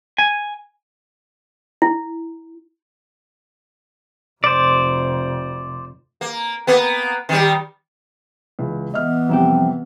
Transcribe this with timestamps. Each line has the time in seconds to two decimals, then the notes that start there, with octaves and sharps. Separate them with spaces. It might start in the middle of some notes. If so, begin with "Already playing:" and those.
0.18 G#5
1.82 E4
4.44 F1 C5 D5
6.21 A#3
6.67 A#3 B3
7.29 D#3 G3
8.59 C#2 E3
8.94 E3 B3 D#5 E5 F6
9.29 C2 F2 E4 G4